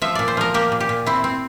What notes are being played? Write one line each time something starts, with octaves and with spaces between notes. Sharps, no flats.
F3 E5
A#2 D5
C5
F3 A#4
A#3 G4
A#2
G4
A#2
C4 E4
C4